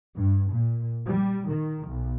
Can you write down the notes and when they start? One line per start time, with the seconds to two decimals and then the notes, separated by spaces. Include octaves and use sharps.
0.17 G2
0.52 A#2
1.06 G3
1.49 D#3
1.88 B1